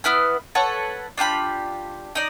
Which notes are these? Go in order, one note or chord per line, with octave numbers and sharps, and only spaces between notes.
B3 E4 B4 F6
A4 B4 C#5 F#5
D4 F4 G4 B5
D#4 D5